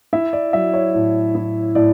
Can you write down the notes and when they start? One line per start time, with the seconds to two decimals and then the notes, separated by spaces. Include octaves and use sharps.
0.13 E4 E5
0.33 D5
0.53 F#3 E5
0.74 C#5
0.94 A2
1.35 E4
1.75 A2 D5